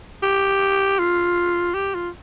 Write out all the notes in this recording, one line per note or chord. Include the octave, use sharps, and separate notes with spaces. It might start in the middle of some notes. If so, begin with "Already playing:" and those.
G4
F4
G4
F4